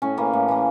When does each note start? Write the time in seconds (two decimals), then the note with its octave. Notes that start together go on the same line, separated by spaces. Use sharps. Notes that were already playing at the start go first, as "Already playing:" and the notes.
0.02 A2 C#4
0.17 E3 A#3
0.33 A2
0.48 E3 A#3